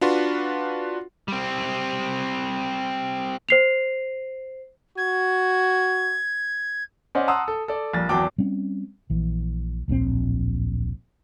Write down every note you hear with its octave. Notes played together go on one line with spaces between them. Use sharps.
D4 F4 F#4 B4 C6
G3 C4
C5 C7 F7
F#4 G#6
C#4 C5 D5 D#5 F#5
F#5 A5 A#5 C6 D#6 E6
A4
A4 D5
A#1 G3 A6
G#1 E2 F#3 G5 A5 D6
G3 C4 C#4
A#1 E3
D1 A#1 C3 C4